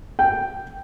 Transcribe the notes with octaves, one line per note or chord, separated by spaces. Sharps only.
G5